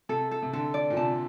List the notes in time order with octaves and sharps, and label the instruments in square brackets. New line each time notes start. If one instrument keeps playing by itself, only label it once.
[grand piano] C3 [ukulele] A4
[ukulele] A4
[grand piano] C3
[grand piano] D3 [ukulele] A4
[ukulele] D5
[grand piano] A#2
[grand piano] C3 [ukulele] A5